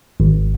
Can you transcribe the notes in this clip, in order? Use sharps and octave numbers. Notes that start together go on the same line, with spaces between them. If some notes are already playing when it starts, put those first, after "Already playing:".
G#1